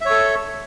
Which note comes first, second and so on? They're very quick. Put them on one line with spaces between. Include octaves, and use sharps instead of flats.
E5 C#5 A4